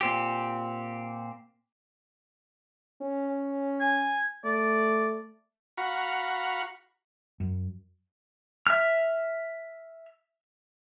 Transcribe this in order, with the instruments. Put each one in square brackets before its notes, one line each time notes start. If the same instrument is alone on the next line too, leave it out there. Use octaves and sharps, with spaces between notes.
[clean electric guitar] A#2 C4 G4
[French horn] C#4
[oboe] G#5
[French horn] A3 [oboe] D5
[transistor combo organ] F#4 F5 F#5 A#5 B5 C#6
[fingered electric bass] F#2
[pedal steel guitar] E5 F6